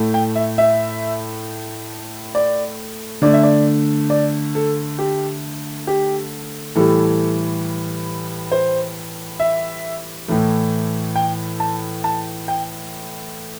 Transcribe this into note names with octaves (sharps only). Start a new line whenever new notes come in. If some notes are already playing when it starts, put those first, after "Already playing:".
Already playing: A2 A3
G5
E5
E5
D5
D3 A3 D5
E5
D5
D5
A4
G4
G4
A2 E3 G3 A4
C5
E5
A2 E3 A3
G5
A5
A5
G5